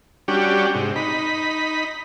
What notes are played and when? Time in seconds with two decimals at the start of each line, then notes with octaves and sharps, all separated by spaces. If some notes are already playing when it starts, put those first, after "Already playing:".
0.28 G3 C#4 D4 F#4 G4
0.75 G#2 C3
0.96 D#4 B5